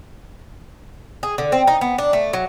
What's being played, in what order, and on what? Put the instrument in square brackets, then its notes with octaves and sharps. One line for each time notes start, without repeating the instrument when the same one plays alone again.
[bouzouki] G#4
D3
C4
D#4
B3
D4
A3
F#3